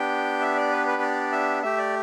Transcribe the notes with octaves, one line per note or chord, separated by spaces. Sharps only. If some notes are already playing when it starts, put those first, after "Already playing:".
Already playing: B3 D4 G4 G5
E5
D5
B4
B4
D5
E5
A3 G4 E5
D5